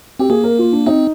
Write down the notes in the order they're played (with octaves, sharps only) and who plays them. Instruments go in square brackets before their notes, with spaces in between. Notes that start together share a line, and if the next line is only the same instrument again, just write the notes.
[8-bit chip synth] C4 [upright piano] G4
[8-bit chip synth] A#3 [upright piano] G#4
[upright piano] A#4
F4
D4
[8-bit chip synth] C4 [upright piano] D#4